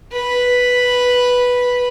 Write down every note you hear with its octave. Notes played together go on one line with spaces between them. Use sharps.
B4